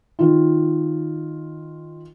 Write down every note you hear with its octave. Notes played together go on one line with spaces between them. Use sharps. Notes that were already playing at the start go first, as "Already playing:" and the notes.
D#3 F4